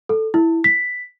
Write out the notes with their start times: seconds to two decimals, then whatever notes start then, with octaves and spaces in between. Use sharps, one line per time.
0.09 A4
0.34 E4
0.64 B6